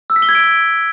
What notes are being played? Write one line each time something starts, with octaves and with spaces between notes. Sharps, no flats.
E6
B6
G7
G#6
D7